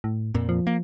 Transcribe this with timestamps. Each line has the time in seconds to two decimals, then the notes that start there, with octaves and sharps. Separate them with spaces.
0.04 A2
0.34 F2 A#2
0.49 F3
0.67 A#3